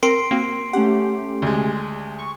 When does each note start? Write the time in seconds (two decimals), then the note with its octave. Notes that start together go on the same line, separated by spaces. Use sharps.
0.03 C4 A#4 C6 C7 D7
0.31 A#3 C4 F#4
0.73 A3 C#4 G4 F#5
1.42 D2 G#3
2.19 C#6